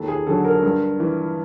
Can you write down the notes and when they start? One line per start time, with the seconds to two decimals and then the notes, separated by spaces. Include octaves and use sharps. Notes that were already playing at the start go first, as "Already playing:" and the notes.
Already playing: D#2 A4
0.08 G#4
0.27 D3 F#3 A4
0.45 A#4
0.62 G2
1.00 E3